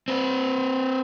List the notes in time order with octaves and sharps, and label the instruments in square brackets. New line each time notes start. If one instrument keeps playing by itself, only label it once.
[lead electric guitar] C4 B4